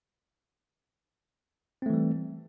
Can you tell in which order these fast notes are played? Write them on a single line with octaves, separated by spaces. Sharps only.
C4 A3 E3 G3